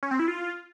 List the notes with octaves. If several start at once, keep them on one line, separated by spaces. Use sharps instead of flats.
C#4
C4
E4
F4